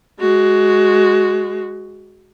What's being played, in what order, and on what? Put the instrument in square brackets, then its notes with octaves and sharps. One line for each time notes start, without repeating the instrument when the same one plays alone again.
[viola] G#3 F#4